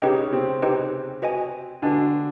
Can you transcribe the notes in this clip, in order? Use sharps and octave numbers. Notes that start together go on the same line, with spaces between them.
C#3 C#4 D#4 G4 B4 D#5 G5
C3 C4
D#4 G4 B4 D#5 G5
F#4 B4 D#5 G#5
D3 D4 F#4 B4 D#5 G#5